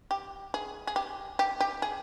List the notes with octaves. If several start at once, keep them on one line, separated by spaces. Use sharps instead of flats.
G4
G#4
G#4
G4
G4
G4
G#4